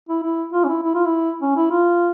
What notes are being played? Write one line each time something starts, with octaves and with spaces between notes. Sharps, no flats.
E4
E4
F4
C#4
E4
E4
F4
E4
C#4
E4
F4